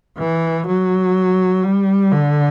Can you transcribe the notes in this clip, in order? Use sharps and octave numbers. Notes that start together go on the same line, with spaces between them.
E3
F#3
G3
D3